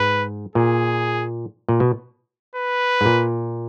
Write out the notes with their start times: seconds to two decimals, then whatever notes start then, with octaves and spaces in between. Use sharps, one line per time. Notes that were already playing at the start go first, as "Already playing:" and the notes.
Already playing: G#2 B4
0.55 A#2 G#4
1.69 A#2
1.80 B2
2.56 B4
3.01 G#2
3.06 A#2